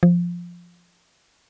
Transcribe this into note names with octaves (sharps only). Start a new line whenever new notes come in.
F3